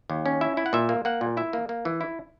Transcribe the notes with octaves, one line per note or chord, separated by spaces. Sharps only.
D#2
C#4
E4 E5
E4
F#5
A#2 E5
A#3
A#3 F#5
A#2
E4 E5
A#3
A#3
E3
E4